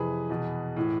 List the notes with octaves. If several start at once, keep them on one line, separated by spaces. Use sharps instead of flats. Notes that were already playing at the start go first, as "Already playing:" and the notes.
Already playing: F2 C3 E3 G#4 B4
E2 B2
A2 E3